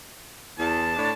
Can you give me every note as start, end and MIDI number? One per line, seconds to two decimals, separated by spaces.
0.58 0.93 40
0.58 1.13 81
0.95 1.11 45
0.95 1.11 62